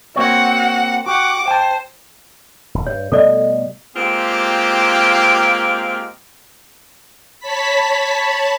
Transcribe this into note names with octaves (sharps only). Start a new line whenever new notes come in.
A#3 C4 F#4 C#5 F#5
F#4 G4 F#5 D6
C5 G5 A5
D#1
G2 C#5
B2 G3 A3 A4 D5 D#5
G#3 A#3 C4 F4 G4
C#5 A5 B5 B6